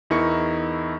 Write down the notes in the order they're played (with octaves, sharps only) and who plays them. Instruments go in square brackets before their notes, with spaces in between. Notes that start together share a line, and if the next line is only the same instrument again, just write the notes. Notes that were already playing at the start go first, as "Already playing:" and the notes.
[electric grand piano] E2 D#4 E4 A#4 C#6 C#7